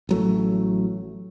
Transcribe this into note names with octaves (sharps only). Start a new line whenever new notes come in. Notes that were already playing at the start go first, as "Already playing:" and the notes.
A1 F#3 A3